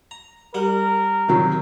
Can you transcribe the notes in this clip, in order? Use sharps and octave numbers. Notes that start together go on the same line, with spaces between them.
A#5
G3 A#4 F#5
C3 D#3 F#3